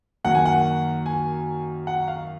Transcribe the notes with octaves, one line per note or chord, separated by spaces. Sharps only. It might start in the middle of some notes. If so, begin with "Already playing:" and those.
F#2 D#3 A#3 F#5
G#5
F#5
G#5
F#5
F5